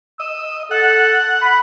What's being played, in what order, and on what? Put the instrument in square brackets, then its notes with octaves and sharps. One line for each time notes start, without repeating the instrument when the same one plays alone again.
[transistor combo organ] D#5 [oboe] E6
[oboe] A4 [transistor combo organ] F#5
[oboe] B5